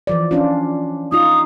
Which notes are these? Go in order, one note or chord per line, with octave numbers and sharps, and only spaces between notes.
E3 F3 D5
C#4 D4 F4
D#4 F4 D#6